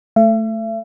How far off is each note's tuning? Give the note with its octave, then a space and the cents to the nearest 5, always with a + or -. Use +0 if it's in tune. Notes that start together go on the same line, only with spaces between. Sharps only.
A3 +0 E5 +40